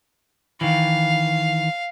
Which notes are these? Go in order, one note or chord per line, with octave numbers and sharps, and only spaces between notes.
D#3 E3 F5